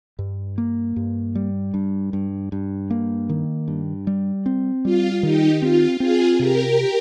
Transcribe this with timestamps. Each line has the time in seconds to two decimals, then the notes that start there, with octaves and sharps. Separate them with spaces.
0.19 G2
0.58 A#3
0.96 G2
1.35 G3
1.74 G2
2.13 G2
2.52 G2
2.90 A#3
3.29 D#3
3.68 G2
4.07 G3
4.46 C4
4.85 G3 F4
5.23 D#3 D#4 G4
5.61 C4 F4
6.00 C4 F4 G#4
6.39 C3 G4 A#4